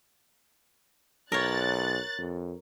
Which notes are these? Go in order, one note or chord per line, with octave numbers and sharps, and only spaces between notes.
B1 A#4 C#5 F#6 A6
F2